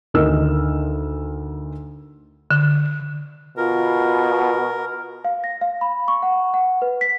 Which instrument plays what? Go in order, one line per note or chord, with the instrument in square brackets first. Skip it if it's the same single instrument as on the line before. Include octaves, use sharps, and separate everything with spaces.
[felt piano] D2 D#3 D#4 A#4 E6 F6
[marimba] D3
[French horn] B2 [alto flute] F4 [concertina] A#4
[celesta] F5
A#6
F5
B5
C#6
F#5
F#5
B4
B6